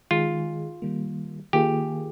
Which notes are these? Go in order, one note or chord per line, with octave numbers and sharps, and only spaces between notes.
D#3 G#3 D#4 F4 G#4
D#3 G3 A#3
D#3 A#3 F4 G4 G#4